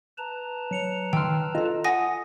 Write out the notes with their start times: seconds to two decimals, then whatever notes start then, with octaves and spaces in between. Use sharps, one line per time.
0.18 B4 A5 A#5
0.71 F#3 C#7 F7
1.13 D#3 G5 C6 E6 F6
1.55 F4 A4 D#5
1.84 F#5 G#5 D#6 A#6